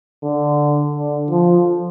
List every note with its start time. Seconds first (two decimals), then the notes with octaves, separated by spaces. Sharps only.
0.23 D3
0.95 D3
1.31 F3